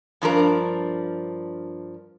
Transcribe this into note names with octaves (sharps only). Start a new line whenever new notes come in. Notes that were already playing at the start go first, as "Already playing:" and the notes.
G2 F3 D4 A#4